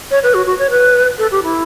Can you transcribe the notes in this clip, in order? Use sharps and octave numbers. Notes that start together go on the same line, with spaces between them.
C#5
B4
F#4
F#4
C#5
B4
A4
G4
E4